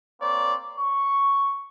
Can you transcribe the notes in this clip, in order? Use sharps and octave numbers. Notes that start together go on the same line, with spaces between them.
A#3 C4 C#5 D5
C#6